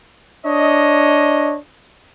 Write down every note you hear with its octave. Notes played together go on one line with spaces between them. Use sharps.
D4 C#5 D#5